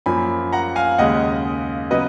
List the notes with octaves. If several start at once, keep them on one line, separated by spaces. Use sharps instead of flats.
F#2 F3 A#3 G#5 B5
F#5 A#5
F5 G#5
D#2 C#3 G#3 D#5 F#5
C#3 F#3 B3 B4 D#5